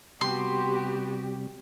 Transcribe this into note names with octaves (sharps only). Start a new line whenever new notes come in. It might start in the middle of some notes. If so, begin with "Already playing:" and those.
C3 G3 B3 F#4 G4 C6